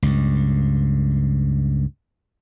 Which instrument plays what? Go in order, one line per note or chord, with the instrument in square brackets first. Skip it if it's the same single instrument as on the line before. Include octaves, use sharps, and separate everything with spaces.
[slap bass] C#2 G2